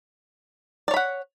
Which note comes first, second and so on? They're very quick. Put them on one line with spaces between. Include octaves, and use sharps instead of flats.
D5 C#5 B5 F#5